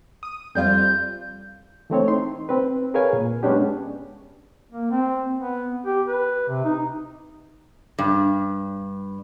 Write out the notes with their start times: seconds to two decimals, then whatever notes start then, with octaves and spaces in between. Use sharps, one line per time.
0.23 D#6 D#7
0.55 F2 G3 F4 G6
1.90 E3 A3 C4 C#5
2.08 D#4 C6
2.49 C4 B4
2.94 G#4 A#4 B4 C#5 F5 G#5
3.13 A#2
3.43 G#3 B3 C#4 D4 G4
4.72 A#3
4.91 C4
5.39 B3
5.86 G4
6.08 B4
6.48 C3
6.64 D#4
7.99 G2